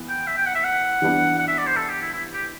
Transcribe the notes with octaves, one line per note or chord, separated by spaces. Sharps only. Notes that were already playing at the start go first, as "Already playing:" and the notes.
Already playing: E3 B3
G5
E5
G5
F#5
E5
F#5
E3 G3 B3 D4
F#5
E5
D5
C5
A4
G4
E4
E4
G4